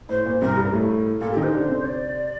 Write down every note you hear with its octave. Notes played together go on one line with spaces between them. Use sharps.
A2 C5
A#2
C2 C3 A#4
G2 G3
A2 A3
A#2 A#3 A4
D#3 D#4 G4
C5
D3 D4
C3 C4
D5